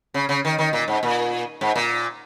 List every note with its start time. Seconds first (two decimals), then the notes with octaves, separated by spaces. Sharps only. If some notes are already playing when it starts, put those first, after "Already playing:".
0.14 C#3
0.29 C#3
0.45 D#3
0.58 D#3
0.73 A#2
0.88 G#2
1.03 A#2
1.61 G#2
1.76 A#2